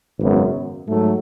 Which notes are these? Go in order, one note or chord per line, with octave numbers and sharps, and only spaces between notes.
G#1 F#2 C#3 G#3 B3
G#2 F#3 A3